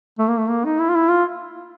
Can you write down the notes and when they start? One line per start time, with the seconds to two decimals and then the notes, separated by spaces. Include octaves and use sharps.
0.19 A3
0.28 A#3
0.38 A3
0.49 A#3
0.65 D#4
0.80 E4
0.90 F4
0.96 E4
1.10 F4